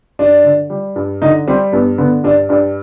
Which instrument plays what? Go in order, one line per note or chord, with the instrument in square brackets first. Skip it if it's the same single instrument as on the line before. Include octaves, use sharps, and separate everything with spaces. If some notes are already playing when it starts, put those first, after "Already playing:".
[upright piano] G2 [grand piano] D4
[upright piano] D3
G3
G2
[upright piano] D3 [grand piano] D#4
[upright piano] G3 [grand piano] C4
[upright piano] G2 [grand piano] B3
[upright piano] D3 [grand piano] B3
[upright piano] G2 [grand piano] D4
[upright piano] G2 [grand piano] D4